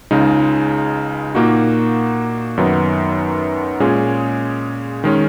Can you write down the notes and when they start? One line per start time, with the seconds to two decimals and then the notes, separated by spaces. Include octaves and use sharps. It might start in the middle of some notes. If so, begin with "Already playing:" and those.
0.11 C#2 C#3 G#3 D#4
1.35 A#2 A#3 D#4 F#4
2.57 F#2 D#3 F#3 B3 D#4
3.80 A#2 G#3 C#4 G#4
5.04 D#3 G#3 C#4